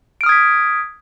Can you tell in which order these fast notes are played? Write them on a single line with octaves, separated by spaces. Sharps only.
D7 F6 D#6 G#6 B6